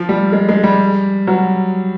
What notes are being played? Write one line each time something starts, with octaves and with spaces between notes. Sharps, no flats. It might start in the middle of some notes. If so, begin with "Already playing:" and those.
Already playing: F3
G3
G#3
G#3
G3
F#3